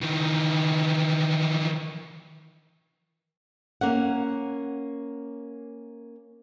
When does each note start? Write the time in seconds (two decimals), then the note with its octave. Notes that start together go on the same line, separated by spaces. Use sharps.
0.03 D#3 E3
3.81 A#3 C#4 F#5